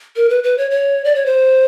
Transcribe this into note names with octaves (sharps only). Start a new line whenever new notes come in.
A#4
B4
B4
C#5
C#5
D5
C#5
C5